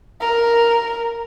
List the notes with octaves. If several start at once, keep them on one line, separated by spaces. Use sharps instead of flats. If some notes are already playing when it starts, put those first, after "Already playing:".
A#4